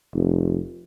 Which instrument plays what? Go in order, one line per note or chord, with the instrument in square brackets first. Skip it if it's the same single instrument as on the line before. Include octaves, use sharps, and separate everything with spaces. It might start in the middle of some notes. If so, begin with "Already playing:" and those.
[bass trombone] F1